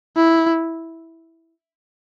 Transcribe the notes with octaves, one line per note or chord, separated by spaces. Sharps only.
E4